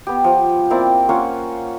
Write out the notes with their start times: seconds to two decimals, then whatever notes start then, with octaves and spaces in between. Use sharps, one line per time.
0.07 B3 G4
0.24 F3
0.70 A#3 C4 E4 D5
1.09 A#3 C#4 F4 F#5